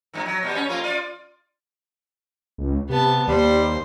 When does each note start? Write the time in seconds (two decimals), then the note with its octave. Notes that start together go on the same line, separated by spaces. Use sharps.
0.13 G2 A#2 D#3
0.26 F#3
0.43 B2 G3 B3
0.55 C#4
0.68 F2 A#3 F4
0.84 F4 D5
2.58 C#2
2.90 C3 B3 A5
3.28 D#2 G3 C5